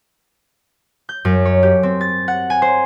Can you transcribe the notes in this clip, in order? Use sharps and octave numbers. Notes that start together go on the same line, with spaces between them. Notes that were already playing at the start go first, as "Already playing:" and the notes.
G6
F#2
C#5
G4
C4
A6
F#5
G#5
C5